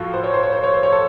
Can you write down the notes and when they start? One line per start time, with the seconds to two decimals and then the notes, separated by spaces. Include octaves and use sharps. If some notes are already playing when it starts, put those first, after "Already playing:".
Already playing: A2 F3 F4 F#4 A4
0.14 C5
0.24 C#5
0.34 C5
0.43 C#5
0.53 C5
0.64 C#5
0.74 C5
0.83 C#5
0.92 A4